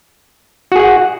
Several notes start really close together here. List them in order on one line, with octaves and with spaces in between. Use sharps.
F#4 G#4 F#5